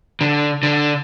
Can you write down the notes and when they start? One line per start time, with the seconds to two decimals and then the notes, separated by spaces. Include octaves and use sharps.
0.21 D3
0.63 D3